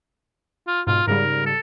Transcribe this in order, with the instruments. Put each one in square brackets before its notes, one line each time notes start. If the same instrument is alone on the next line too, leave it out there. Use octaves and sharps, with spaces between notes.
[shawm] F4
[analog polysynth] G#2 B2 [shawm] F4
[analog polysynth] G#2 C#3 G3 [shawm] A#4
[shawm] A4